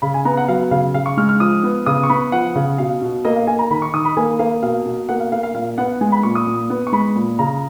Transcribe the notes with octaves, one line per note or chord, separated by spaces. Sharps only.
C#3 B5
G#5
B3 A#5
F#5
F#3 F5
C#3 F5
C#3 F5
C#6
G#3 F6
F6
F3 D#6
B3
C#3 D#6
C#6
B3 B5
F3 F#5
C#3
B2 F5
B2
A#3 D#5
F5
A#3 G#5
A#5
D#3 B5
C#6
D#3 D#6
B5
A#3 G#5
A#3 F5
B2 F5
B2
A#3 F#5
F5
A#3 F5
F5
A#2 F5
B3 F#5
G#3 G#5
B5
A#2 C#6
D#6
A#2
B3
C#6
G#3 B5
A#2
C#3 A#5